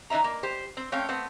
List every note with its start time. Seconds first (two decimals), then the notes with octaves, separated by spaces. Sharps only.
0.10 E3 D#4 D5 E5 A#5
0.24 A#3
0.43 G4 C5
0.77 C4
0.92 A3 C4 C#4 C#5 F5 G5
1.09 A3 B3 C4